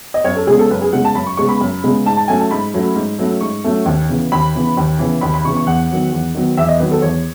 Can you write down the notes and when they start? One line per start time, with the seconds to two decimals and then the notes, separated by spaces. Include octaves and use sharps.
0.14 D#5
0.24 F#2 C#5
0.36 A4
0.47 C#3 G#3 B3 G#4
0.59 A4
0.71 F#2 B4
0.81 G#4
0.93 C#3 G#3 B3 F#5
1.05 A5
1.15 F#2 B5
1.27 C#6
1.37 C#3 G#3 B3 C#6
1.49 B5
1.60 F#2
1.83 C#3 G#3 B3
2.05 G#2 A5
2.17 A5
2.28 F#3 A3 C#4 G#5
2.40 A5
2.51 G#2 B5
2.74 F#3 A3 C#4
2.95 G#2
3.18 F#3 A3 C#4
3.41 G#2 C#6
3.64 F#3 A3 C#4
3.86 D#2
4.09 C#3 E3 B3
4.32 D#2 B5
4.54 C#3 E3 B3
4.77 D#2
4.99 C#3 E3 B3
5.21 D#2 B5
5.34 B5
5.45 C#3 E3 B3 C#6
5.56 C#6
5.67 E2 F#5
5.89 D#3 F#3 B3
6.12 E2
6.35 D#3 F#3 B3
6.57 E2 E5
6.68 D#5
6.80 D#3 F#3 B3 B4
6.91 A4
7.02 E2 C#5